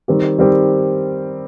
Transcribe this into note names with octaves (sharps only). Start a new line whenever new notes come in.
D#3 G3 C4 G4
D#3 G3 C4 G4